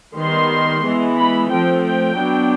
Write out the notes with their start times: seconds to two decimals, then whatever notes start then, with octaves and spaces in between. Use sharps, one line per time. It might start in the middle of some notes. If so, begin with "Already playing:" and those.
0.16 D#3 G3 B3 C6
0.83 E3 G#3 B3
1.17 B5
1.49 F3 A3 C4 G5
1.83 G5
2.16 F#3 B3 D4